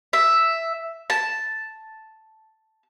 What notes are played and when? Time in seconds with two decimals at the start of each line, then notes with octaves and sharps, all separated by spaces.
0.13 E5
1.10 A5